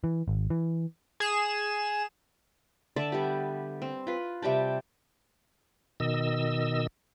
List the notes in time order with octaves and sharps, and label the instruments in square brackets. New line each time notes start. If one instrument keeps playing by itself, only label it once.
[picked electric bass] E3
G#1
E3
[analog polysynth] G#4 E7
[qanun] D3 D5 E5 A5
G3 B3 G4
C4
F4 B4
C3 G3 G5 A5
[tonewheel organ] B2 D#3 D#5 E6